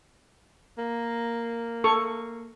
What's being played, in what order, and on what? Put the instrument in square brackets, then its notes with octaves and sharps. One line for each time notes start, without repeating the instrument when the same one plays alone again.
[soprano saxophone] A#3
[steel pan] A4 C#6